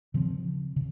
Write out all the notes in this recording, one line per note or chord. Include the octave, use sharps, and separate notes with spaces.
C#3 F3 C4
C#3